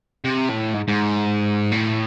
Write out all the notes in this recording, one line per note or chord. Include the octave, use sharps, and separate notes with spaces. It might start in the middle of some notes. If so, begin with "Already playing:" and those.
C3
A2
G#2
G#2
A2